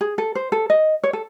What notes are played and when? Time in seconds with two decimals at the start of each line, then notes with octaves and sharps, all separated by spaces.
0.01 G#4
0.18 A4
0.35 C5
0.52 A4
0.70 D#5
1.03 C#5
1.13 A4